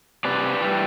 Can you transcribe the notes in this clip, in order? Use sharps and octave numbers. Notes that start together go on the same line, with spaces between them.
C3 B4 D5
E3 G3